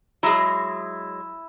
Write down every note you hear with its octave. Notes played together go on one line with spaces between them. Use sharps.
F#3 G#3 E4